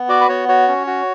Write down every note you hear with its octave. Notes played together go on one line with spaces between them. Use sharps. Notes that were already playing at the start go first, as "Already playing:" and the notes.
Already playing: B3
F#4 D5
B4
B3 C#5
F#4 C#5
C#4
F#4